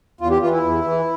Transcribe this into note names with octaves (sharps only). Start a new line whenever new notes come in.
E2 F4
G4
E3 F4
E4
E2
E3